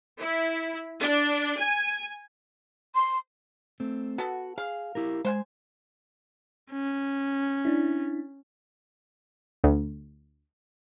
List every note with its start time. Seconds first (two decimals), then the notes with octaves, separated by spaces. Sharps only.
0.20 E4
1.00 D4
1.57 G#5
2.94 C6
3.80 A3 C4
4.18 B3 F#4 A4
4.58 G#4 F5
4.95 E4 G4 A#4
5.25 G#3 C5 F#5 G#5
6.72 C#4
7.65 D4 E4
9.64 D2